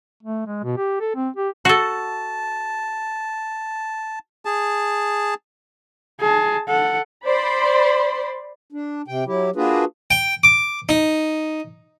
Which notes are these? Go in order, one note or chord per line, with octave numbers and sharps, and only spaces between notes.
A3
G#3
B2
G4
A4
C4
G4
F#4 A4 A5
G#4 A5
G#4 A5
A4 F#5
C5 D5 B5 C6
D4
C3 G5
F#3 E4 G4
A#3 D4 F4 F#4 G#4 B4
G5
D6
D#4